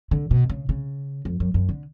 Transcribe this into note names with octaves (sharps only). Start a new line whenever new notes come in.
D3
B2
C#3
C#3
F2
F#2
F#2
D3